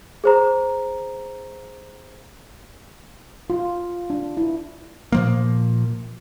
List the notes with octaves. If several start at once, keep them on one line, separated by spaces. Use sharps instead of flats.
G#4 C5 A#5
F4
D4
E4
A#2 F3 A#3